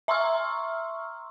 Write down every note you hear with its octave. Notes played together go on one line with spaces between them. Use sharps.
E5 A#5 C6 C#6 E6 F6